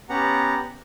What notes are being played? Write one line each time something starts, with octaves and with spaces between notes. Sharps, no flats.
B3 C#4 G4 F#5 A#5